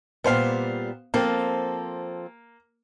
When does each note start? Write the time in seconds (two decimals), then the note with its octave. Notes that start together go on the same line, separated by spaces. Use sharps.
0.24 A#2 G3 B3 C5 F5
1.14 F3 A#3 C4 A4